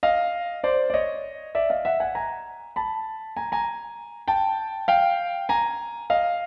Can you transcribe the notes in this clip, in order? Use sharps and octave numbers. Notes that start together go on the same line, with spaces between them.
D#5 F5
C5 D5
D5
C#5 D#5
D5 E5
D#5 F5
E5 F#5
F#5 G#5
G#5 A#5
A5 B5
G#5 A#5
G#5 A#5
G5 A5
F5 G5
G#5 A#5
D#5 F5